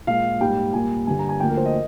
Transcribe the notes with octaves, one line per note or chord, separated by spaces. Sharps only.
A#2 G#3 F5
G#2 G3 A#3 G5
A#2 G3 A#3 G#5
G2 D3 G3 G#5
A#5
G#5
D2 D3 F3 A#3 G5
A#4
C5
D#5